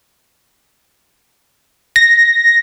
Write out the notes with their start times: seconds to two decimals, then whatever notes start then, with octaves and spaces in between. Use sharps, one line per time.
1.96 A#6